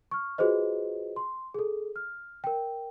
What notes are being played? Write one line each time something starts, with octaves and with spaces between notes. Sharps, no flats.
C#6 F6
F4 F#4 G#4 B4 C5 D#5
C6
G#4 A4
F6
A#4 G5